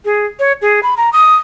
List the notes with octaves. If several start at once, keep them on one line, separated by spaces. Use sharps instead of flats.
G#4
C#5
G#4
B5
A#5
D#6